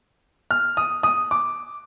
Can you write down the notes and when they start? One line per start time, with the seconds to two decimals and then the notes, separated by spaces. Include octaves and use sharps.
0.51 F6
0.77 D#6
1.03 D#6
1.31 D6